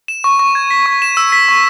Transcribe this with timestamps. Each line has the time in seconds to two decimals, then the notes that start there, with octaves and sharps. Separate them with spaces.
0.08 E7
0.24 C#6
0.39 C#6
0.55 G#6
0.70 B6
0.86 C#6
1.02 E7
1.17 E6
1.32 B6
1.48 C#6